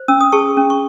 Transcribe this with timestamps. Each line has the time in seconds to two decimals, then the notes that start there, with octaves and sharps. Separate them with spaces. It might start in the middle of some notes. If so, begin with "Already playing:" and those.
Already playing: C5
0.08 C#4 E6
0.20 D#6
0.32 G#4 A5 C#6
0.57 C#4
0.70 C#6